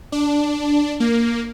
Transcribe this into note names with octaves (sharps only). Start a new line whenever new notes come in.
D4
A#3